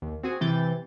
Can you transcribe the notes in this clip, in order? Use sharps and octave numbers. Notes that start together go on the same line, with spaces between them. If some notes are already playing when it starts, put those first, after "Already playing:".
D#2
C4 F#4 G#4 G#5
C3 E3 G5 G6 A6